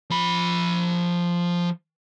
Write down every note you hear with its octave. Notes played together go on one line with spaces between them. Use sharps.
F3 B5